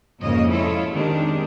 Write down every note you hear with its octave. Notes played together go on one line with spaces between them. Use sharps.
F2 G#2 C#3 A#3 C#5 D#5
E4 F4 A4 C#5
D#3 G#3 C4 D4 G4